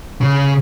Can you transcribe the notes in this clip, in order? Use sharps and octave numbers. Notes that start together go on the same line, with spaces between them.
C#3